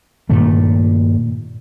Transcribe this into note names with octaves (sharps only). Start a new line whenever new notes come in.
G2 A#2 D#3 A3